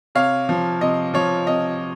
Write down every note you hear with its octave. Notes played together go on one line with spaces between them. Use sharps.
C3 C#5 F5
F3
C3 D#5
F3 C#5
C3 D#5